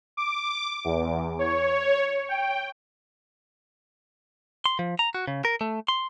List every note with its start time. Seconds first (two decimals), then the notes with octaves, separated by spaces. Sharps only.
0.17 D6
0.85 E2
1.39 C#5
2.29 G5
4.66 C6
4.79 F3
4.99 A#5
5.14 F#4
5.27 C#3
5.45 A#4
5.61 A3
5.88 C6